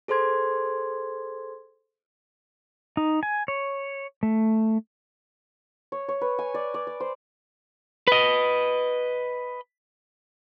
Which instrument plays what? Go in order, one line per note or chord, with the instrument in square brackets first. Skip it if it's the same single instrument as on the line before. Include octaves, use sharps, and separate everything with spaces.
[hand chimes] G#4 A4 C5 C6 G#6
[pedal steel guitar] D#4
G#5
C#5
A3
[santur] C#5
C#5
B4
G#5
D5
D5
D5
C5
[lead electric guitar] B4 D#5